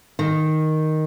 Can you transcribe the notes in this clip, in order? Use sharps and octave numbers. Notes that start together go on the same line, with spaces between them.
D#3